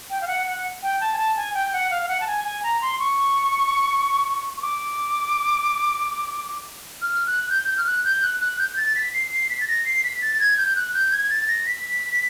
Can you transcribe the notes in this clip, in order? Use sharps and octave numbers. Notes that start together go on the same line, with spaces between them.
G5
F5
F#5
F#5
G5
A5
G#5
A5
G#5
G5
F#5
F5
F5
F#5
A5
G#5
G#5
A#5
C6
C#6
C#6
D6
F6
F#6
G6
G6
F6
F#6
G6
F#6
F#6
G6
A6
B6
C7
C7
B6
A6
A#6
C7
B6
A6
G#6
G6
F#6
G6
G#6
A6
A#6
B6